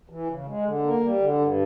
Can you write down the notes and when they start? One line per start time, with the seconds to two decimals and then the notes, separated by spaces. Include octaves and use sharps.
0.09 E3
0.28 C#3
0.46 G#3
0.65 D3
0.82 A#3
1.01 G3
1.19 D3
1.38 G2